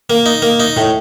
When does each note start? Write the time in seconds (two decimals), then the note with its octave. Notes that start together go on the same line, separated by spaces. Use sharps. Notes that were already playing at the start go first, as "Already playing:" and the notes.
0.10 A#3
0.26 D#4
0.42 A#3
0.60 D#4
0.77 A2